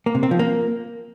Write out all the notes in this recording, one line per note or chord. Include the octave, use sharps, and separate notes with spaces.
A#3
C3
C4
F3
A#3